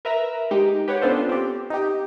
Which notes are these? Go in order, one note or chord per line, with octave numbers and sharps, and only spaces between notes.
A#4 B4 E5 A#5
G#3 D#4 G4
G4 B4 C#5 F#5
B3 C#4 D4 F4 A4 C5
C4 G4
D#4 G4